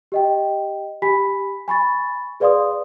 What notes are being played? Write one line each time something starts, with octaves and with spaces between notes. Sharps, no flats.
G4 D#5 G5
G4 G#5 B5 B6
G#5 B5 C#6 A6
G#4 B4 D5 F5 C6 D#6